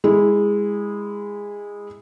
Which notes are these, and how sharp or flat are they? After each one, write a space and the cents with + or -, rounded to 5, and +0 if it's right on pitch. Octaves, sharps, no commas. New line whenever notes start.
G#3 -15 E4 -10